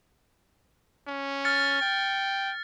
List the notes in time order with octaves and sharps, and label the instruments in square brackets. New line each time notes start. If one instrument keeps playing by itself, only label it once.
[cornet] C#4
[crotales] F6 A6 C#7
[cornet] G5